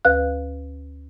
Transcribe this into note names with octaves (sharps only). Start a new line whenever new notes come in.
D2 B4 F5 F#6